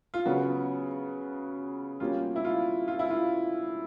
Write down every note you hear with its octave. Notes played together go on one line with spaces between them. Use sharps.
F4
C#3 F#3 B3 F#4
B2 G3 A#3 C#4 F4
E4
F4
F4
E4
F4